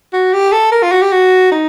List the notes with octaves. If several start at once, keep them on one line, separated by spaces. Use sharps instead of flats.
F#4
G4
A4
A#4
F4
F#4
G4
F#4
D#4